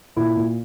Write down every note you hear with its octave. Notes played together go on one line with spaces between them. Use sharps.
A#2 E4
A#2